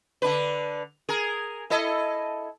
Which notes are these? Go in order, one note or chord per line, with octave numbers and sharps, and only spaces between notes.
D3 D4 B4
G#4 A#4
E4 A4 D#5